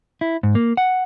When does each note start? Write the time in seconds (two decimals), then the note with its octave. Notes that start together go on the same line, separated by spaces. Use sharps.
0.21 E4
0.43 G#2
0.55 A#3
0.77 F#5